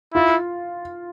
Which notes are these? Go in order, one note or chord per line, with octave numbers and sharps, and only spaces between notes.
E4 F4